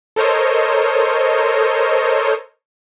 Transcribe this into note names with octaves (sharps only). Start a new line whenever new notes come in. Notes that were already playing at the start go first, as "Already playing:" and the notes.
A4 A#4 C5 C#5 D#5